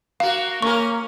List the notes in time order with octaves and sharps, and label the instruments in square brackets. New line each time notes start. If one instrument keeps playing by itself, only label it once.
[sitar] A#3 F#4 [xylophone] F5
[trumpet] A#3 [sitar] C#4 A#4 [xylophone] C#6